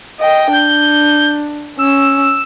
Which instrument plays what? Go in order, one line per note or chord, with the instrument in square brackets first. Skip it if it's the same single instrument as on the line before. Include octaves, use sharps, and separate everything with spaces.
[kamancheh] D#5 G5
[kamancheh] D4 [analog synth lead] G6
[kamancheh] C#4 [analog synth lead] E6